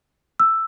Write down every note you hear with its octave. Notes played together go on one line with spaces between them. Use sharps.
E6